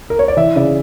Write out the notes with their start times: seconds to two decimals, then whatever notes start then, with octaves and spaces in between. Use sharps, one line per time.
0.10 A#4
0.19 C#5
0.28 D5
0.37 E3 E5
0.56 C#3 D5